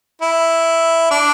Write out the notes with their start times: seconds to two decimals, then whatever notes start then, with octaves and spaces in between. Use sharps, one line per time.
0.21 E4
1.11 D4